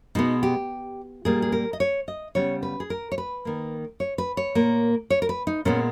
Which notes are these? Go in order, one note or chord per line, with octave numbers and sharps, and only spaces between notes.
B2 G#3 B3 D#4
G4
A#2 G3 A#3 G#4
G#4
A#4
D#5
C#5
D#5
C#3 G3 B3 C#5
B4
G#4
A#4
C#5
B4
D#3 A#3
C#5
B4
C#5
A#2 A#3
C#5
A#4
B4
D#4
A#2 G#3 B3 C#4